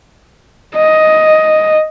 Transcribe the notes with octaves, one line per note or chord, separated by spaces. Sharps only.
D#5